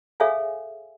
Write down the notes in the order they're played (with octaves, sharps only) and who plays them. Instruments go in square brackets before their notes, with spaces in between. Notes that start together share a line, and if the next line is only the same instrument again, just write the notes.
[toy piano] G#4 A4 C#5 E5 F5 G#5